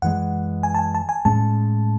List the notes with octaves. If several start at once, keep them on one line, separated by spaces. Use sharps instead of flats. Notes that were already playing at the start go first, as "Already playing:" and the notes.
F#2 E3 G#3 F#5
G#5
A5
G#5
A5
G#5
A2 G#3 C#4 A5